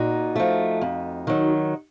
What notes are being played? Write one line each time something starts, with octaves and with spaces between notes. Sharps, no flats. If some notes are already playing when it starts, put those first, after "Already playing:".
Already playing: A#2 D#4 F#4
F3 A3
F2
D#3 F#3